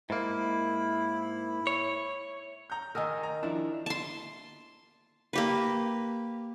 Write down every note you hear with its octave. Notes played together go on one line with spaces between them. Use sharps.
G#2 A#3 E4
C#5
A#5 G6
D#3 A#4 G#5 D#6 E6
A#5
F3 D4 E4
A5 C6
A#3 G4 B4